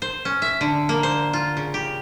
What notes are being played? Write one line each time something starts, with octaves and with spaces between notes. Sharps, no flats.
C5
C#4
E5
D3
A#3
C5
F4
C#3
G4